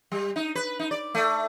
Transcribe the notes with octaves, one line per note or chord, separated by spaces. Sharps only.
G3
D#4
B4
D#4
D5
A3